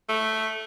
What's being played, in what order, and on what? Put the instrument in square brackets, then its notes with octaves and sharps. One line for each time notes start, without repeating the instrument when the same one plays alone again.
[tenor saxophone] A3